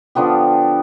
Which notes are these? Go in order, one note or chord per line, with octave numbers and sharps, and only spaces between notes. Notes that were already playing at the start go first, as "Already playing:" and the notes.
D3 F3 B3 G4